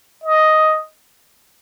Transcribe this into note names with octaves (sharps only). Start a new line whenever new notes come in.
D#5